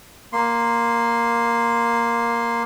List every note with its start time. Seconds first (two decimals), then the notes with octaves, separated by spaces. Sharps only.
0.33 A#3 C6